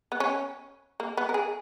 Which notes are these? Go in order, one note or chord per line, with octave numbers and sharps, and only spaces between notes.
B3
C#4
A#3
B3
A#4
G#4